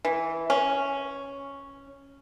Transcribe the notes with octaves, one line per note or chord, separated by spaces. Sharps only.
E3
C#4